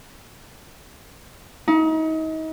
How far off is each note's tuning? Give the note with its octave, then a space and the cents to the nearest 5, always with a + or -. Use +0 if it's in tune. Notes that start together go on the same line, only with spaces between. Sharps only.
D#4 +35